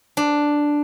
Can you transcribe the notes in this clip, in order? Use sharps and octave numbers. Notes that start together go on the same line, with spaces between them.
D4